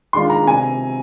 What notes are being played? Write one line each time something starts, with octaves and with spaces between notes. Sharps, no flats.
D#3 G#3 D4 F4 C6
A#5
C3 G#5